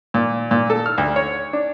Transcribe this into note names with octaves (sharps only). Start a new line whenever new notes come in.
A#2
A#2
A4
F6
D2
C#5
D4